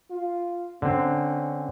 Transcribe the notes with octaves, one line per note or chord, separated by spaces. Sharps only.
F4
D3 C4 C#4